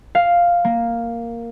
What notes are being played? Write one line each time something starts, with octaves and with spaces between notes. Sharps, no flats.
F5
A#3